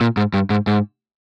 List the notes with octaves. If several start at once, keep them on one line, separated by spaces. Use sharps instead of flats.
A#2
G#2
G2
G#2
G#2